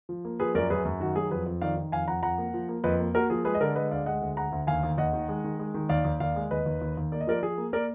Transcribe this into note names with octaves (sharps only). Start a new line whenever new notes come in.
F3
A#3
F3 G#4 B4
F#2 A#4 D5
F#2 G#4 B4
F#2
D#3 F#4
F#3 G#4
F2 G#4 B4
F2
D#3 D5 F5
D#3
F2 F5 G#5
F2 F#5 A#5
F2 F#5 A#5
A#3
F3
A#3
F2 B4 D#5
A#3
A#3 F#4 A#4
F3 G#4
G#3 G#4 B4
D#5
D3 A#4 D5
G#3 B4 D#5
D2 D5 F5
G#3 D#5 F#5
D2
D2 F#5 A#5
D2
D#2 F5 G#5
D#2
D#2 D#5 F#5
D#3
G#3
D#3
G#3
D#3
D#2 D5 F5
D#2
D#2 D5 F5
G#3
D#2 B4 D#5
D#2
D#2
D#2
A#3 D5
D#5
F3 A#4 D5
F3 G#4
A#3
A#3 A#4 D5